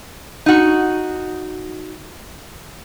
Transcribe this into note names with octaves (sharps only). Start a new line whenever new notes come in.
D#4 F#4